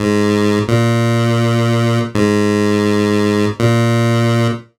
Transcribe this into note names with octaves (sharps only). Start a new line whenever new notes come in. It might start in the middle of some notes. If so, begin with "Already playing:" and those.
Already playing: G#2
A#2
G#2
A#2